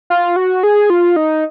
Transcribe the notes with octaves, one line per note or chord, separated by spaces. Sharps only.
F4
F#4
G#4
F4
D#4